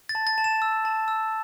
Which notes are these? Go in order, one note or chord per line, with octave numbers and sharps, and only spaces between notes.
A6
A5
A6
A5
E7
E6
A5
E6